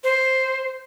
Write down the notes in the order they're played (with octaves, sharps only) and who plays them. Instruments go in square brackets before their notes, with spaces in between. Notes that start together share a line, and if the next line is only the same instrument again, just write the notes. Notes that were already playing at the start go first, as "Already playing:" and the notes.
[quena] C5